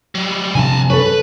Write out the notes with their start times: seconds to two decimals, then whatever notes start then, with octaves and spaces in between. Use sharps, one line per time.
0.15 F#3 G3
0.55 C3 F3 D4 G#5 A5
0.90 A4 B4 C#5